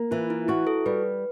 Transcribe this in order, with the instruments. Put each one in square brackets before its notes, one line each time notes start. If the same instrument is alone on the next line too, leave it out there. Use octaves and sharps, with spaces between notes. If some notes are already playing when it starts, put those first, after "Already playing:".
Already playing: [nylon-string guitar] A#3
[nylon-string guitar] E3 [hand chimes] F4
[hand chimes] E4
[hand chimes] E4 [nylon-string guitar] F#4
[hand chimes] A4
[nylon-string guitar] G3 [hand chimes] B4